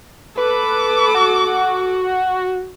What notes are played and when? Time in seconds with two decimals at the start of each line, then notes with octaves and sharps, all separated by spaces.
0.38 A4 B4 D6
1.15 F#4